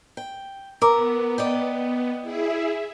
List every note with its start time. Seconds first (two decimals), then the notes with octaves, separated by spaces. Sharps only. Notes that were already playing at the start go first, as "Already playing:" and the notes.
0.17 G5
0.82 B3 A#4 A#5 D6 E6
1.38 D5 D#5 G5
2.21 E4 G#4 E5